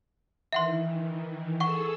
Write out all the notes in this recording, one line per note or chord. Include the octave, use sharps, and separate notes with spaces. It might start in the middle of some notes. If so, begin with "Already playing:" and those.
D#3 E3 E5 F#5 C6
G#4 A4 F#5 C#6 E6